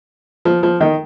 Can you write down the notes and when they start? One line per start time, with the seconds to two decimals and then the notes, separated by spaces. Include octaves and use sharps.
0.45 F3
0.63 F3
0.81 D#3